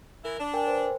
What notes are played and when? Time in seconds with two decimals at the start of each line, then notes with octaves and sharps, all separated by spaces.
0.23 E3 E4 A#4
0.39 D4
0.54 A#4 G5 G#5
0.67 B4 C5